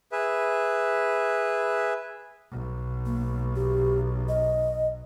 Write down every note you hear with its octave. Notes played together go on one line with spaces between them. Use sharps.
G#4 B4 E5
B1
A#3
G4
D#5